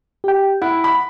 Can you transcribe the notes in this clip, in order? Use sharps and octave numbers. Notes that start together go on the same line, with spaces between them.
G4 G5
E4 F#5
B5